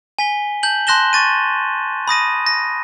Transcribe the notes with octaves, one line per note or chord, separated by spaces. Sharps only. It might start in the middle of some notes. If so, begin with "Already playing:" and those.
G#5 B6 G7
A5 G6 F#7
A5 C6 F#6 A#6 E7 G7
C#6 A6 D#7
B5 D#6 A#6 D#7
A#6